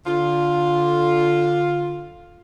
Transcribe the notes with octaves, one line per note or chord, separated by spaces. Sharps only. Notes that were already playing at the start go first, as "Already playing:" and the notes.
D3 F4